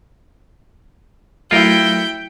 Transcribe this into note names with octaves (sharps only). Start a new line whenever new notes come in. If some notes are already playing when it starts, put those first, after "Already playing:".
F#3 A3 E4 F4 A#4 G5 G6 C#7